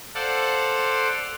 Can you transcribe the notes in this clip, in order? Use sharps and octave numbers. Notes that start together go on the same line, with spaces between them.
A4 C5 D5 F5 F#5